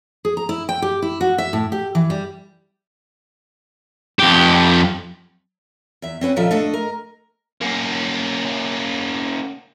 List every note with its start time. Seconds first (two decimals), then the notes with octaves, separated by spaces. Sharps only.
0.25 G#4
0.37 A#5
0.49 E4
0.69 G5
0.82 G4
1.02 E4
1.21 F#4
1.38 E5
1.53 A2
1.72 G4
1.95 E3
2.10 G3
4.19 F2 G4
6.02 E2 E5
6.21 C4 C#4 B4 F#5
6.36 D#2 A#2 F3 F4 A4 E5
6.51 A3 D4 A4 D#5
6.74 A#4
7.62 A#3 C#4